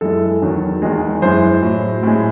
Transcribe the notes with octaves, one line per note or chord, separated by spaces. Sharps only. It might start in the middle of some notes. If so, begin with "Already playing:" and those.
F#2 E3 G#3 A4
E2 D#3 F#3
E2 D#3 G#3
F#2 E3 G#3 C5
A2 F#3
A2 G#3